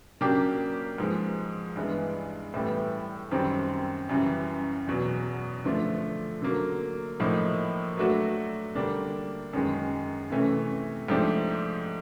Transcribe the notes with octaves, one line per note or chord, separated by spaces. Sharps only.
C#3 F#3 A#3 D4 G4
G#2 F3 G#3
G2 E3 G#3 B3
A2 E3 G3 B3
F#2 D#3 G3 C4
F#2 C#3 E3 G3
E2 B2 F#3
D3 F3 A3 D4 F4
D3 F#3 A#3
A2 F3 A#3 D#4
F#3 A3 D4 F#4
D3 G3 A#3 D4
F#2 D#3 G#3
C3 E3 A3 C#4
G#2 F3 A3 D4 G4